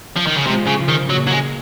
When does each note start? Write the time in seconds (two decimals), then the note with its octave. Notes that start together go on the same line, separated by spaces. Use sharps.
0.17 F3
0.27 D#3
0.37 C#3
0.46 C3 F3 G#3
0.67 C#3
0.78 C#3 F3
0.88 D#3
1.10 A#2 C#3 F#3
1.27 F#3
1.31 G#3